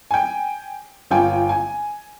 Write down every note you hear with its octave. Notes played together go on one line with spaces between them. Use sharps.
G5 G#5
G1 F4 G5 G#5
G#5